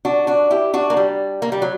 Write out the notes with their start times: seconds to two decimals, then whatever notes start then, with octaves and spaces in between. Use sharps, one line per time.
0.05 D4 F#4
0.27 D4 F#4
0.51 E4 G4
0.73 D4 F#4
0.90 A#3
0.97 G3
1.42 A#3
1.52 G3
1.62 F#3